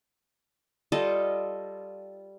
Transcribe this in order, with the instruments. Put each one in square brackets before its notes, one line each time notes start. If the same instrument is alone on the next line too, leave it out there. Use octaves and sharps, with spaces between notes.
[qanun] G3 F4 A4 D#5